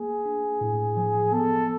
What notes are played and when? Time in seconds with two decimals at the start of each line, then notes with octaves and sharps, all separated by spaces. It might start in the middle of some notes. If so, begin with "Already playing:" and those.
Already playing: A#3 G#4
0.26 D4
0.61 A2
0.97 F3
1.32 B3 A4